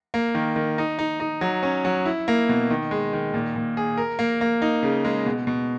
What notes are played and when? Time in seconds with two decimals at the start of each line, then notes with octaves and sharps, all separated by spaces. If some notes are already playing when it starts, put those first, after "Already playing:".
0.14 A#3
0.35 D#3
0.56 D#3
0.78 D#4
0.99 D#4
1.20 D#4
1.41 F#3
1.63 C#4
1.85 F#3
2.06 E4
2.28 A#3
2.49 B2
2.70 D#3
2.91 G#3
3.13 D#3
3.34 A#2
3.56 A#2
3.77 G#4
3.98 A#4
4.19 A#3
4.41 A#3
4.62 D#4
4.83 C#3
5.05 G#3
5.26 B2
5.47 B2